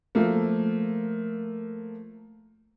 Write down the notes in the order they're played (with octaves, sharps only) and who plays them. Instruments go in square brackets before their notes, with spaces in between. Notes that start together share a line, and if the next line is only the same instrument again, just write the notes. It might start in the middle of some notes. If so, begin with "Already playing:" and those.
[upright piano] F3 A3 A#3